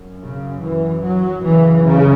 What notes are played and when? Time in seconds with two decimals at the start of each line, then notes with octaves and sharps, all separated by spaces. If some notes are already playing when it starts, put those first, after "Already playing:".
Already playing: F#2
0.20 C#3
0.61 E3
1.02 F#3
1.43 F#2 C#3 E3
1.83 C#3